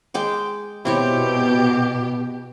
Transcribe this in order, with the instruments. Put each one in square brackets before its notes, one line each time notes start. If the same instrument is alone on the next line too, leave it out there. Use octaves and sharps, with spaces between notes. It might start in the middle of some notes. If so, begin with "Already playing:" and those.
[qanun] G#3 G5 D6
[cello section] B2 [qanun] C4 E4 C#5 [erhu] G4